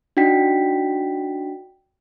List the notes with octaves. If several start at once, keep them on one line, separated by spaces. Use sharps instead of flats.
D4 D#4 F#4 G5 B6